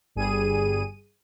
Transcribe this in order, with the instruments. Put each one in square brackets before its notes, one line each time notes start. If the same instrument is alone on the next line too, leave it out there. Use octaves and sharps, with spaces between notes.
[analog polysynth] G1 G3 G#4 D#7